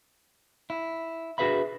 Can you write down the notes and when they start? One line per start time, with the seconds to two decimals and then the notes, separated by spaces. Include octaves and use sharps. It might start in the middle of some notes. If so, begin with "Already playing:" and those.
0.70 E4
1.38 D4 F#4 G#4 B4 E5 B5